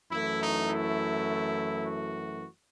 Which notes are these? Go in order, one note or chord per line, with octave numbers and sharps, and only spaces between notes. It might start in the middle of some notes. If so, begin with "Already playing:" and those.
F#2 E3 A3 E4
D#4
E4
F#4